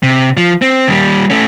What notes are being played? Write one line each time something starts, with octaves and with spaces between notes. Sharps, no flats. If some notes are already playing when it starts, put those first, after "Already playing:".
C3
F3
C4
D#2 G3
A3 C#4